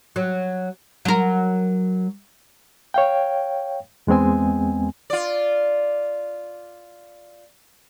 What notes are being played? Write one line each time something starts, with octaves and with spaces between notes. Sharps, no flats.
F#3
F#3 A#4
C#5 F5 G5
E2 G#3 B3 C4 G#5
F4 D5